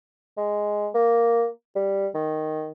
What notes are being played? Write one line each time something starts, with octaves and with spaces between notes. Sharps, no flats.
G#3
A#3
G3
D#3